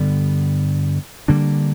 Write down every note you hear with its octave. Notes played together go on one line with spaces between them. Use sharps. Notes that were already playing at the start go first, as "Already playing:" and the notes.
Already playing: G2 D3 G3 B3
D3 G3 A#3 D4